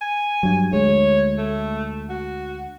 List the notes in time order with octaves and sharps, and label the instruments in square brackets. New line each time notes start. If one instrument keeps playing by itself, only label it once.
[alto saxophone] G#5
[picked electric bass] G2 F#3
[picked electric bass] D2 G#3 [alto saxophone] C#5
[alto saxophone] A3
F#4